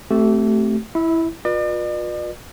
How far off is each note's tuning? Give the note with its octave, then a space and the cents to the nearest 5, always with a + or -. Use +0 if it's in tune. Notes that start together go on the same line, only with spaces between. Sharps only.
A3 +0 C4 +0 G4 -35
E4 +0 E5 -35
F4 +40 B4 -30 D5 +45